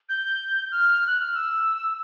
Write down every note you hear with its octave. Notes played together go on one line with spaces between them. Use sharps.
G6
F6
F#6
F6
E6